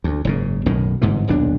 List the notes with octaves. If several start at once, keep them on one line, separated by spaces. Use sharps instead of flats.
D2
F#1 G#2 C#3
B1 F#2 A2 D#3
G1 G#2 C3 E3
D#1 B1 F2 D4